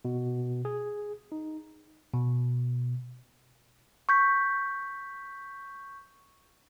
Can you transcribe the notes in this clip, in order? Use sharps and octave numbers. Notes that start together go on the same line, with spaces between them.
B2
G#4
D#4
B2
C#6 G6 B6